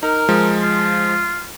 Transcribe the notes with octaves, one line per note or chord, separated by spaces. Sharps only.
D#4 A#4
F3 G#3
F4